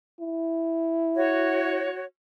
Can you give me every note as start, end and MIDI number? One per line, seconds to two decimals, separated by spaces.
0.20 1.92 64
1.15 2.04 66
1.15 2.04 73